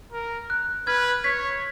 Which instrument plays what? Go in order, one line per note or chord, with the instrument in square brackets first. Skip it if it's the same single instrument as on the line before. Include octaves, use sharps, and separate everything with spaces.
[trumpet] A#4
[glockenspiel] F#6
[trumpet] B4 [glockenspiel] F6 G#6
[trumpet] C#5 [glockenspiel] G#6 B6